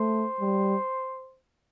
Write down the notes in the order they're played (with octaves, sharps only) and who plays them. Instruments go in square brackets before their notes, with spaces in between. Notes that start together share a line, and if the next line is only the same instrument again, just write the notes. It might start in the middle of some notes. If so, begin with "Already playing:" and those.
Already playing: [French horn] A3 [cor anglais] C5
[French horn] G3